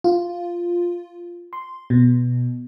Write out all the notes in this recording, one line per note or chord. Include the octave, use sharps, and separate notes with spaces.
F4
C6
B2